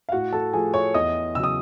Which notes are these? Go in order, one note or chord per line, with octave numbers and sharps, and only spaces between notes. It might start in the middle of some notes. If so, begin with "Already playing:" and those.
F5
A2 F#4 F#5
A4 A5
F3 A3 G#4 G#5
C#5 C#6
E2 D#5 D#6
C#3 F#3 D#6 E6